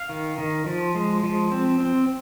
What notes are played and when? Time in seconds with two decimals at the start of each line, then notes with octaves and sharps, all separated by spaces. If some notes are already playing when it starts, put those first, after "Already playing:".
Already playing: F5
0.09 D#3
0.38 D#3
0.66 F3
0.95 G#3
1.23 F3
1.52 C4
1.80 C4